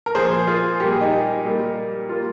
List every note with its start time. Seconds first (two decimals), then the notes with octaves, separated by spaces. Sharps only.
0.06 A#4
0.15 A#2 F3 A#3 G#4 C5
0.47 F4 G#4
0.80 A#2 G3 A#3 G4
0.91 G#4
1.01 D#4 G4
1.45 A#2 G3 A#3
2.09 G3 A#3 F4